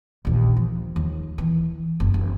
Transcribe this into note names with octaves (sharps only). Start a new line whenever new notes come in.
A#1 D#2
F3
D#2
E3
F#1
F#1